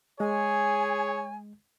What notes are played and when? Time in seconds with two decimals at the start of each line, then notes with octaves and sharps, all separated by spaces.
0.20 G#3 G#4 C#5 G#5